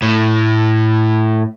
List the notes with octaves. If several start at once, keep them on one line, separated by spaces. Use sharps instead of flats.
A2